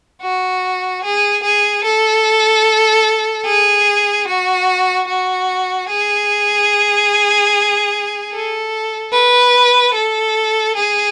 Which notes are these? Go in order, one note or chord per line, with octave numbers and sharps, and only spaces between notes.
F#4
G#4
G#4
A4
G#4
F#4
F#4
G#4
A4
B4
A4
G#4